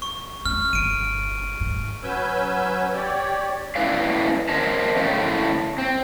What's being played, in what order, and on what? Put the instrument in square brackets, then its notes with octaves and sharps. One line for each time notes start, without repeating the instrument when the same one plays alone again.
[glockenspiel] C#6
[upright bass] C#4 [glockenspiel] F6
[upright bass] G1 [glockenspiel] D7 D#7
[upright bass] G#2
[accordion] F#3 C#4 B4 G#5 E6 G6
G4 C#5 D5
[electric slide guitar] A2 C#4 E4 B4 D5 F5
A#4 C5 C#5 D#5 E5 A5
A2 C#3 A3 C#4 C5
C4